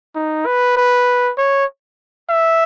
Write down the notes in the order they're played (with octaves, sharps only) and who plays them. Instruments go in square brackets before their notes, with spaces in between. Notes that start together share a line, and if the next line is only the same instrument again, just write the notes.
[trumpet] D#4
B4
B4
C#5
E5